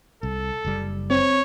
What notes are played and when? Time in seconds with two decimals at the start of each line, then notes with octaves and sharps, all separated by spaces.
0.23 C2 A4
0.65 F#1 G3
1.10 C4 C#5